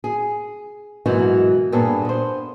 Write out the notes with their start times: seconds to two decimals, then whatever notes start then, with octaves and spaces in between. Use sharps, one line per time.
0.04 G#4
1.06 G#2 B2 E3 F#3 A#3 F#4
1.72 G2 A#2 B3 G#4 A4
2.05 B3 C5